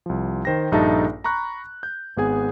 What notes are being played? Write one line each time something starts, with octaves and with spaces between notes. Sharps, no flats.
C2 F3
D#3 C5 G5 A#6
A#1 G2 D#4 A4 E5 A5
A#5 B5 C#6 F#6
G6
G#1 B3 G#4 G#5